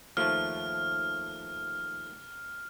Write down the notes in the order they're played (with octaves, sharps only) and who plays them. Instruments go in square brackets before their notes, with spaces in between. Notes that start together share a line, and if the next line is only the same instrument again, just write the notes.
[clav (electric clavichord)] D#2 F3 A3 [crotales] F6